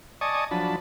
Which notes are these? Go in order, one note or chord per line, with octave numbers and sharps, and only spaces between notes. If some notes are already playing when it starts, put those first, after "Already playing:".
D5 D#5 G#5 A5 C#6 D#6
F3 F#3 D4 A5 B5